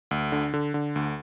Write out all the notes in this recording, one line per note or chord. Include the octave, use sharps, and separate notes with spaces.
D2
D3
D3
D3
D2